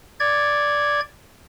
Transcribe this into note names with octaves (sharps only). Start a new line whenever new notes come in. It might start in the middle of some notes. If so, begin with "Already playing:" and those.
D5 G#6